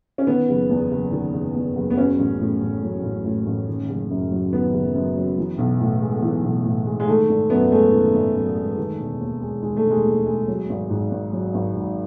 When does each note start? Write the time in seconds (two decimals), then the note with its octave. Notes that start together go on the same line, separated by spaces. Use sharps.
0.18 C#4
0.27 D#3 B3
0.49 F#1
0.70 E2
0.91 F#1
1.12 D#3
1.34 F#1
1.55 E2
1.76 F#1
1.90 B3
1.97 F#3 C#4
2.19 A1
2.40 A2
2.62 A1
2.83 F#3
3.03 A1
3.25 A2
3.46 A1
3.68 D#3
3.89 F#1
4.10 F#2
4.31 F#3
4.53 D#3 B3
4.74 F#1
4.95 F#2
5.17 F#3
5.37 E3
5.58 B1
5.80 A2
6.01 G#3
6.22 E3
6.43 B1
6.65 A2
6.86 G#3
7.00 G#3
7.07 D#3 A3
7.29 G#1
7.50 F#2 B3
7.71 G#3 A3
7.92 D#3
8.14 G#1
8.35 F#2
8.57 G#3
8.78 D#3
8.99 E1
9.20 D#2
9.41 G#3
9.62 D#3 G#3
9.76 A3
9.84 E1
9.91 G#3
10.05 D#2
10.27 G#3
10.48 F#3
10.69 G#1
10.90 G#2
11.11 G#1
11.33 F#3
11.54 G#1
11.75 G#2